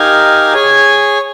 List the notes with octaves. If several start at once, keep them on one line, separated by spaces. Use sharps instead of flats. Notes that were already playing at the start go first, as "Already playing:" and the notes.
Already playing: D#4 G4 A#4 F5 G#5
G#4 C#5 G#5